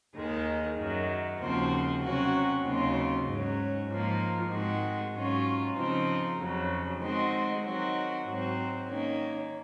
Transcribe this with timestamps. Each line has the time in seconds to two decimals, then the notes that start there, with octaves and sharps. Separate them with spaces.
0.15 D#2 D#3 G#3
0.78 F#2 D#3 F#3
1.39 D#2 C#3 F3 C4 F#4
2.02 C3 F#3 C#4 F#4
2.64 D#2 C#3 F#3 C4 F4
3.26 G#2 F#3 C#4
3.88 G#2 F3 A#3
4.51 G#2 D#3 G#3 C4 F#4
5.14 G#2 F#3 C#4 F4
5.75 C#3 F3 C4 D#4
6.39 F2 C#3 F#3
7.00 D#3 G#3 C4 F#4
7.63 D#3 F#3 C4 F#4
8.25 G#2 F#3 C4
8.87 D#3 A#3 C#4